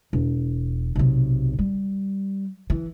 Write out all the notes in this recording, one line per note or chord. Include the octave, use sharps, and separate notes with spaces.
E1
B1 C3
G3
E3